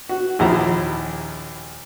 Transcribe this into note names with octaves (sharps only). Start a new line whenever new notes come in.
F#4
A#1 D#2 F3 E4 A#5